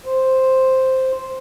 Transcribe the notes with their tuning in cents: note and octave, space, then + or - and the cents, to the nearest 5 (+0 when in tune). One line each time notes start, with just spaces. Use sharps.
C5 +0